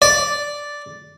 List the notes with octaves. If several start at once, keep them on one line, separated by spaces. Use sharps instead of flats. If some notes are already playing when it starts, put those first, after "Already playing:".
D5